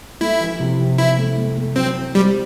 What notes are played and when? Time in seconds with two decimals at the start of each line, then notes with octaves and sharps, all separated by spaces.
0.21 A3 E4
0.41 E3
0.60 C3
0.80 C3
0.98 E3 E4
1.18 A3
1.38 A3
1.57 A3
1.76 F#3 C4
1.96 E4
2.15 G3 C4